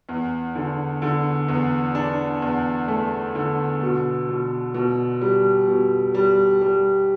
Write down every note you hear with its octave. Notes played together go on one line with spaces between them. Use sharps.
E2
D3
D3
E2
D4
E2
A3
D3
B2
B2
B2
G3
B2
G3
G3